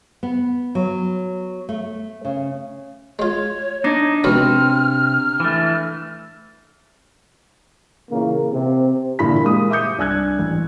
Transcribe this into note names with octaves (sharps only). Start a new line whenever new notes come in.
B3
F#3
A3
C#3
G#3 F4 C#5
D4 D#4
C#2 C3 F#3 B3 F6
E3 A3
A#2 C#3 E3 A#3
C3 C4
A#2 D3 E3 E4 B5 B6
G#3 A#3 G4 D#6
E5 D6 D#6 G6 C#7
C2 D4 G#5 E6 F#6 G#6
A1